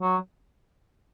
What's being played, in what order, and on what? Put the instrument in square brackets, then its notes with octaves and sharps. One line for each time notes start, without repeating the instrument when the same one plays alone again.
[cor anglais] F#3